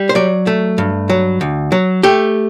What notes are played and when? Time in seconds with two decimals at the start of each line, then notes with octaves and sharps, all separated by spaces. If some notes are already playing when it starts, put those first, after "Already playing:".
Already playing: G3
0.09 C5
0.15 F#3 D5
0.47 A3
0.78 G2
1.10 F#3
1.41 D2
1.72 F#3
2.03 A3 G4